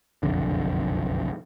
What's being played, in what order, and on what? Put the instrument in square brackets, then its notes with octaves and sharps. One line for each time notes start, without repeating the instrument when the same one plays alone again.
[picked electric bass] F#1 B1 F2 D3